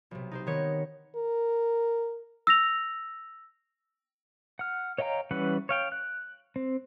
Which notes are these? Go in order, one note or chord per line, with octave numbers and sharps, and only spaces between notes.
B1 C3
D#4 G4 C5
D#3 B3 C#5
A#4
E6 A#6 F7
F#5 F6
C#5 D#5 F5 G5 A#5
E3 G3 C#4 B4 F#5
C#5 F5 G5
F#6
C4